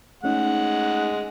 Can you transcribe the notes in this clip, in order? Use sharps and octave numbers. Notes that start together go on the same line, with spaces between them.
G#3 A3 C#4 D#4 F#5